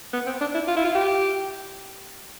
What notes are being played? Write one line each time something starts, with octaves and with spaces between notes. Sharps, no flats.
B3
C4
D4
E4
F4
E4
F4
G4